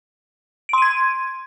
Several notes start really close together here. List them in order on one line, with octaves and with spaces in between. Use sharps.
D7 C6 D#7 G#6